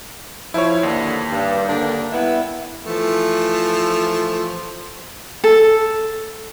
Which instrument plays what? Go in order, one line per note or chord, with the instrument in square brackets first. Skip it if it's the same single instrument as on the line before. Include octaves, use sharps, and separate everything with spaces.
[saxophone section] F3 [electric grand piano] E4 C#5
[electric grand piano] D#2 [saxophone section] D3
[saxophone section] G2
D3 A#3 D4
G3 B3 E4
[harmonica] E3 F3 A3
[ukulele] A4